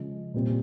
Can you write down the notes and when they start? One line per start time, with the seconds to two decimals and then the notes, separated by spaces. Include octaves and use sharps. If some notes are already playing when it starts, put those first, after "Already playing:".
Already playing: C#3 F3 G#3
0.34 A#2 G3 C4